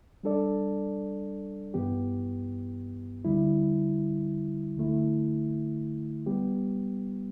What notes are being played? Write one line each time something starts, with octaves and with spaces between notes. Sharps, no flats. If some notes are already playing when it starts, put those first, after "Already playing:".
G3 D4 A4 D5
G2 E3 B3 G4
D2 D3 G3 E4
D2 D3 A3 E4
G3 B3 G4